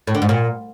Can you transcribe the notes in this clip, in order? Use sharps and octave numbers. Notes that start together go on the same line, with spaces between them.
A2
D3
G#2
A#2